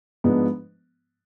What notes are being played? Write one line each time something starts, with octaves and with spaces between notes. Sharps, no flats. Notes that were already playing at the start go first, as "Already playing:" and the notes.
G#2 F3 G#3 B3 D4